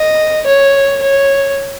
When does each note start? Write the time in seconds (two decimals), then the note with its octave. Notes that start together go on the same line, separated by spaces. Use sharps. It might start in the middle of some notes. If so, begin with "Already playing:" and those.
Already playing: D#5
0.47 C#5
1.02 C#5